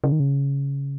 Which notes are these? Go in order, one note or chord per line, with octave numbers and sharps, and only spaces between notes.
C#3
D#3
C#3